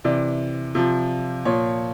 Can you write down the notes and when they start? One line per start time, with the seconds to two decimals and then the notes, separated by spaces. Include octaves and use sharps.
0.04 C3 E3 D5
0.75 C3 F3
1.45 A#2 F3 C#5